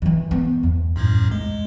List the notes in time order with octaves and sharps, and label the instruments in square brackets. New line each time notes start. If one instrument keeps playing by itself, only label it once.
[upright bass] D#3 E3
B3
E2
[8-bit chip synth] B1 F#2 A2
G#3